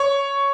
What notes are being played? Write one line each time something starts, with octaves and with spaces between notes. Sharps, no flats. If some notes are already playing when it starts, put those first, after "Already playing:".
Already playing: C#5 C#6